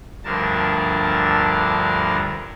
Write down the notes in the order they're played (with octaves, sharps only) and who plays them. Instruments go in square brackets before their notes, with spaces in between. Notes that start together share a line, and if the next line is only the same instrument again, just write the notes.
[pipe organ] D2 G2 D3 F3 A#4 A5